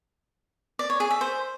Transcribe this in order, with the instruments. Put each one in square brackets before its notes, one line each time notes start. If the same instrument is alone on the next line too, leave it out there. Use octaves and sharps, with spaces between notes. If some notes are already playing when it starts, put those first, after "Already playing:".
[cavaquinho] D5
C#5
G#4
E5
C5